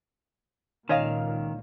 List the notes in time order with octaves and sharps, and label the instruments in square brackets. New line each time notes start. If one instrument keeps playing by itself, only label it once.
[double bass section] C#2 A#2 [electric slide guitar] D#3 [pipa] C#4 D#5 F5